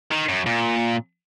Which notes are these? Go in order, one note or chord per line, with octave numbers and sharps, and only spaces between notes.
D#3
F#2
A#2